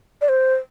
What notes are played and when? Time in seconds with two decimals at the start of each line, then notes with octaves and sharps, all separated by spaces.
0.21 D5
0.29 C5